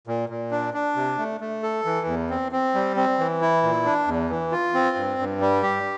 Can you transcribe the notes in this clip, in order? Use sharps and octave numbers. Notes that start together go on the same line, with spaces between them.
A#2
A#2
D4
D4
C3
A3
A3
A4
E3
E2
C4
C4
G3
C4
E3
E4
A#2
D4
E2
E3
F4
C4
G2
G2
G3
G4